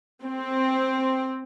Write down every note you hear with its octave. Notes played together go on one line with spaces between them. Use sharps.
C4